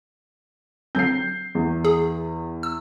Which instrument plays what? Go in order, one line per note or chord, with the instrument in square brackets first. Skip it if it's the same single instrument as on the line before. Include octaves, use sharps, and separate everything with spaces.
[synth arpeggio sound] D3 F#3 C4 [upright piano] G6 C7
[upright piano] E2
[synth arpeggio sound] G#4
E6